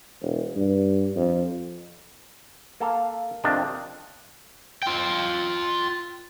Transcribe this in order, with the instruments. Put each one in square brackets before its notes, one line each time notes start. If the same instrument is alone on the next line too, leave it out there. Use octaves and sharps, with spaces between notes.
[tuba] E1
G2
F2
[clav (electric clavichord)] A#3 A4 F5
F2 C3 D#3 D4 D#5
[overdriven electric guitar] F4 G5